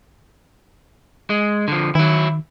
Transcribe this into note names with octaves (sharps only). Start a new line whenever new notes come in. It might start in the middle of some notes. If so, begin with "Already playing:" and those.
G#3
D3 F3
D#3 F#3 E4